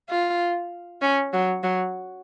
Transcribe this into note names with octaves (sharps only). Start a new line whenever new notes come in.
F4
C#4
F#3
F#3